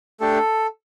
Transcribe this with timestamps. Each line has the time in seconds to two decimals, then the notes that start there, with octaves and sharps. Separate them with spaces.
0.20 A3 D4 G4 A4